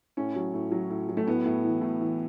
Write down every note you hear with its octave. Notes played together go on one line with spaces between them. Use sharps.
A2 C#4
F#3
A2
F#3
A2
F#3
A3
A2 B3
A2
E3
A2
E3